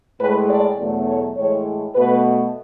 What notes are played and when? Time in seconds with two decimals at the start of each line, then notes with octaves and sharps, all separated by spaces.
0.20 A2 G#3 B4
0.48 D5
0.78 E2 B2 F#3 A3
1.08 C#5
1.36 A2 E3 G#3 C#5
1.95 B2 A3 B4